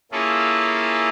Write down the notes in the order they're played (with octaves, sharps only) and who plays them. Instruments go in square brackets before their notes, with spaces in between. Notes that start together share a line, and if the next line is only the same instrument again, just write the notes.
[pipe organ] A#3 C#4 E4 F4 G#4 A4